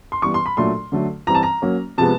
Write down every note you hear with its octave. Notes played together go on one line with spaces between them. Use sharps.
C6
E3 G3 B3 C#6
C6
B5
A#2 F#3 A3 D4 C6
D3 F#3 A3
E3 G3 C4 A#5
A5
A#5
F#3 A#3 C#4
C3 F3 G#3 B3 A5